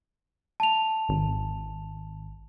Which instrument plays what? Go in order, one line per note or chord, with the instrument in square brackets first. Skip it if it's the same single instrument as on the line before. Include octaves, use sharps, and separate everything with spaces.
[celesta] A5 F7
[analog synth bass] G#1